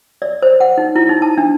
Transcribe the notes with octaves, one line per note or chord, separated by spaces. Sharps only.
D5
C5
F#5
D#4
E4
D#4
A5
D4